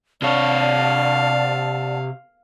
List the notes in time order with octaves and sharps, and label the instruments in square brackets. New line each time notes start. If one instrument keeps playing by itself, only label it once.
[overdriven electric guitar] C3 C#5 [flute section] D5 F#5 A5 [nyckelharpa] F5